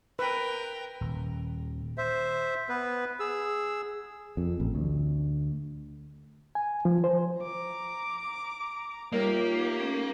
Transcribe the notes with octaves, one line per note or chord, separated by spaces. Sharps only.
A#4 B4 G5
D#1
C5 E5
B3 B4
G#4 E6
F2
A1
D2
G#5
F3
C5
A#5 D6
G3 A#3 D#4 F4 G4 A#4 C#5 E5
A3 C#4 A4